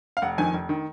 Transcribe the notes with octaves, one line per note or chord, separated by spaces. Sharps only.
F5
F1 F#5
F2 D#3 G#5
F1
D#3